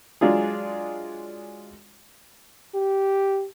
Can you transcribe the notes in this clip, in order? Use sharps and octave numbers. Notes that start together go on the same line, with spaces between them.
F#3 G#3 D4 F4 G#4
G4